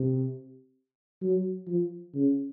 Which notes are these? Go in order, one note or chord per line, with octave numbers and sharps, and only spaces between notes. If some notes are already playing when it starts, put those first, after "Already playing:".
Already playing: C3
F#3
F3
C#3